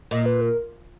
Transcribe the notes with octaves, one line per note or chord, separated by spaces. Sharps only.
A#2 D#5
B4
A#4